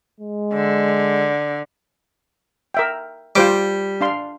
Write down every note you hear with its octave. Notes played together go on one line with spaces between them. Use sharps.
G#3
D3
A#4 E5 G5
G3 F4 C5 D6
D4 F5 C6